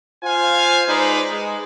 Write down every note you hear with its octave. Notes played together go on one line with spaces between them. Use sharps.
F4 C5 F5 G#5
G#3 D#4 G#4 B4 C5 D5
G#3